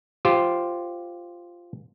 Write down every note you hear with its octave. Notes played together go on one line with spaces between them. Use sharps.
F4 G4 C5